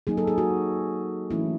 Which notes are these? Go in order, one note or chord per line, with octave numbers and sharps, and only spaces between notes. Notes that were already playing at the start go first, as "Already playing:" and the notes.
F#3 A#3 D#4 G#4
A4
G#4
F#4
E3 A3 C#4 E4